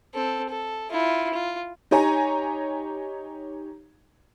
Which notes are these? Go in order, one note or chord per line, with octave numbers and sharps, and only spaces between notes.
C4 A4
A4
E4 F4
F4
D#4 G4 C#5 G#5 A#5